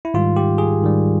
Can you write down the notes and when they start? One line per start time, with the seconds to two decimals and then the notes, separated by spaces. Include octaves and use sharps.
0.05 E4
0.14 G#2 D#3 G3 F4
0.36 G4
0.58 G#4
0.81 G#2 D#3 G3